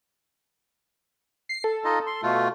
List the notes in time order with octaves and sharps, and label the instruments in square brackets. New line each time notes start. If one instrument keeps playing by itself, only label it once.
[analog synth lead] C7
A4
[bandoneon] D#4 F4 D#5
C6
B2 A3 F4